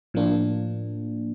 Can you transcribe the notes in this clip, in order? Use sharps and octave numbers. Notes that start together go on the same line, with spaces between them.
A2 F3 A#3 D4